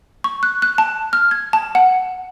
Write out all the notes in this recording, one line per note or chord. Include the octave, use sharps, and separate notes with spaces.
C#6
F#6
F#6
A5
F6
G#6
A5
F#5